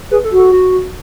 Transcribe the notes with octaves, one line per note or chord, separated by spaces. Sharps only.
G#4 B4
A4
F#4
A4
F#4